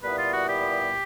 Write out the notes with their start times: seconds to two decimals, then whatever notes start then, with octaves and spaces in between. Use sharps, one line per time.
0.02 A#2 G3 B3 E4 B4
0.18 F4
0.33 F#4
0.48 G4